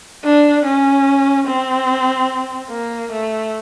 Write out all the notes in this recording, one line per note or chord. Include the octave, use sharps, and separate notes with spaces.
D4
C#4
C4
A#3
A3